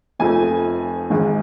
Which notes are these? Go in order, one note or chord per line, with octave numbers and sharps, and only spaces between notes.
F1 F2 F3 A3 G#5
G#1 G#2 G#3